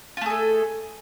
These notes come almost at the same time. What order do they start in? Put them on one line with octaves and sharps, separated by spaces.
F4 A3 G#4 A4